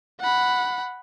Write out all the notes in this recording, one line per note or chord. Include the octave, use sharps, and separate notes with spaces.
F#5 B5